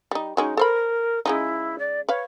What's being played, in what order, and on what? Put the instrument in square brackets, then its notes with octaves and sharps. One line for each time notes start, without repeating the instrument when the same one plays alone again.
[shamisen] G3 D#4
[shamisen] F#3 G#3 C#4 [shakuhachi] D#4
[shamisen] A4 C5 B5 [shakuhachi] A#4
[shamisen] C#3 G#3 D#4 [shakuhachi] E4
[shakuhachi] D5
[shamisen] B4 F5 [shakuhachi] C#5